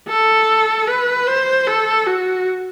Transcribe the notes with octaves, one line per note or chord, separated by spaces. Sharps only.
A4
B4
C5
A4
F#4